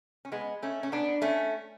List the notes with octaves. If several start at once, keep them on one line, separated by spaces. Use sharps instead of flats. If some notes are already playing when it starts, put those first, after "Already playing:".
C#4
G#3 B3
A3 C#4
C#4
B3 D4
A3 C#4